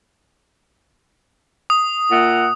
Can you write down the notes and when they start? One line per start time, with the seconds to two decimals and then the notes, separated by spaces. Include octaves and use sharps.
1.70 D#6
2.11 A#2 E5 F#5